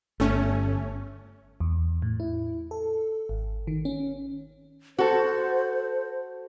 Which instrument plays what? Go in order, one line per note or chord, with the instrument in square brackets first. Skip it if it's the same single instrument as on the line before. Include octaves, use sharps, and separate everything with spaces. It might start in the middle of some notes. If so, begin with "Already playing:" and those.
[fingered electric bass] G1 [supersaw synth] A3 C#4
[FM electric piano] E2
A2
E4
A4
G#1
D#3
C#4
[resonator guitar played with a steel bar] F#4 A4 [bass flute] C5